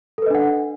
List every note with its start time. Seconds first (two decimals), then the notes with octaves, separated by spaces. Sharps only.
0.18 A4
0.22 B4
0.26 D#5
0.30 D4
0.35 F#5